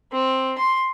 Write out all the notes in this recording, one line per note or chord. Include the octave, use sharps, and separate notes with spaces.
C4
C6